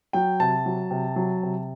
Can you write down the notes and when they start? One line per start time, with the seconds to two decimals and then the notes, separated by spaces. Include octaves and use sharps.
0.13 F#3 G5
0.40 C3 A5
0.66 F#3
0.91 C3
1.16 F#3
1.43 C3